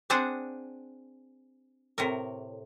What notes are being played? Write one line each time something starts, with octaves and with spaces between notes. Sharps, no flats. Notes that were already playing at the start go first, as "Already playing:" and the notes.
C4 D4 G#4 C5 F#5
A2 C3 A#4